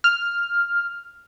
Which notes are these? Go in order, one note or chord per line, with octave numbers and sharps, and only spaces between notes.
F6